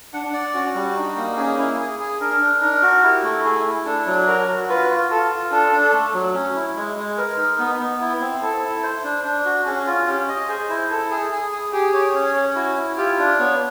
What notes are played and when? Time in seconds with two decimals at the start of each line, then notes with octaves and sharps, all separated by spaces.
0.13 D4 F#5
0.33 D5
0.54 C#4 F#4
0.75 G3
0.96 D4 D#4
1.17 A#3
1.37 C#4 G#4
1.58 E4
1.79 G#4
1.99 G#4
2.21 D4 A#4
2.41 D4
2.61 D#4 A#4
2.82 F#4
3.03 E4 G4
3.23 A3
3.44 E4 G#4
3.65 E4
3.86 D4 A4
4.07 F#3
4.27 F#4 A#4
4.48 F#4
4.69 F4 B4
4.90 F4
5.10 F4 A4
5.31 F4
5.51 D4 A4
5.72 D4
5.93 A3
6.14 F#3
6.34 C#4
6.55 E4
6.76 G#3
6.96 G#3
7.17 A#4 B4
7.37 D#4
7.59 B3 B4
7.79 B3
8.01 E4
8.20 C4
8.41 E4 A4
8.63 E4
8.83 C5
9.04 D4
9.24 D4
9.45 F#4
9.66 C#4 G#4
9.87 F4
10.07 C#4 G4
10.29 D#5
10.49 G#4 C5
10.69 E4
10.90 E4 A4
11.11 G#4
11.31 G#4
11.52 G#4
11.73 G4 G#4
11.94 C#5
12.14 C#4
12.36 C#4
12.55 E4 F#4
12.77 E4
12.98 F4 G4
13.18 D4
13.39 B3 C#5